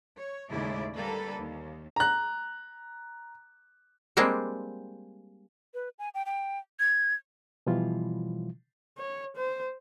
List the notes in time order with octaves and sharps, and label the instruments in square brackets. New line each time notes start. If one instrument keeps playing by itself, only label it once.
[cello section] C#5
D#2 A2 C#3 G#3 E4 D5
D3 G3 A#3 A4 B4
D#2
[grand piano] A#5 F#6
[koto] G3 G#3 A#3 C4 D4
[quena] B4
G#5
G5
G5
G#6
[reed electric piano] B2 E3 F3 G3 E4 F4
[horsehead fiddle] C#5
C5